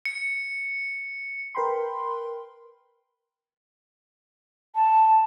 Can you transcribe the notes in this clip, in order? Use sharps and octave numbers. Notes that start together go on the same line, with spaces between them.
C#7
A#4 B4 G5 B5 C6
A5